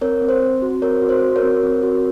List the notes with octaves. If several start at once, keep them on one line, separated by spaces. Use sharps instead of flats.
C4 A#4 C#5
C4
C5
C4
F#4
C4 A#4 C#5
F#4
C5
F#4
A#4 C#5
C4
C4
F#4